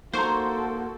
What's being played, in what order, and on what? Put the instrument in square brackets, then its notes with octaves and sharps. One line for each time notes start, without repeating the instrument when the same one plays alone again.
[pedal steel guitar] A#3 C#6 [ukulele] D#4 A#5 [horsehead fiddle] F#4 A4 [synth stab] C5